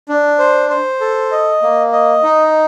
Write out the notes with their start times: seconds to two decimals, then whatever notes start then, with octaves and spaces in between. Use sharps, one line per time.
0.09 D4
0.39 C5
0.70 C5
1.00 A4
1.32 D#5
1.62 A#3
1.93 D#5
2.24 D#4